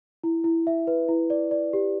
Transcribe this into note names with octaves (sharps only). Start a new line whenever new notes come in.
E4
E4
E5
B4
E4
D5
D5
G4